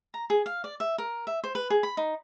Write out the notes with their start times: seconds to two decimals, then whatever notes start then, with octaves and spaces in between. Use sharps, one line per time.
0.14 A#5
0.30 G#4
0.46 F5
0.64 D5
0.80 E5
0.98 A#4
1.27 E5
1.44 C5
1.55 B4
1.70 G#4
1.83 B5
1.97 D#4